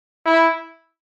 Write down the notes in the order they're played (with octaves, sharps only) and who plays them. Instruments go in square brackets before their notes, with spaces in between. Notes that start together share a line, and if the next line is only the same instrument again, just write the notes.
[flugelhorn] E4